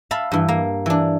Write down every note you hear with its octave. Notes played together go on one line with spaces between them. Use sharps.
E5 F5 A5 B5
G2 E3
A#3
E3 D4